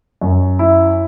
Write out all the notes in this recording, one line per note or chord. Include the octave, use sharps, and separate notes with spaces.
F#2
E4